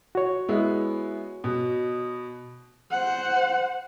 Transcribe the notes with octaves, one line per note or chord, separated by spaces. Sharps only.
F#4 C#5
G#3 B3 E4
B2
C5 F#5